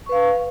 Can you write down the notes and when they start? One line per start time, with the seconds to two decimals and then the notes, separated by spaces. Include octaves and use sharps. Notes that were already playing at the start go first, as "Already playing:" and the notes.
0.06 C#6
0.09 B4
0.12 F5